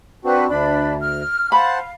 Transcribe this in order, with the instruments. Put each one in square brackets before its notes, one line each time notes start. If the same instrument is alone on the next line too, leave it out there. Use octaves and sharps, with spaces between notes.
[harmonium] C4 D4 F#4 [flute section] B4
[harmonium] D2 [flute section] D4 B5
[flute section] F6
[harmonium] C5 F#5 A5 [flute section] F5 [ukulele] B5